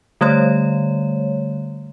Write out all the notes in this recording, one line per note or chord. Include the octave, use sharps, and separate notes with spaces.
D3 G3 A3 C#5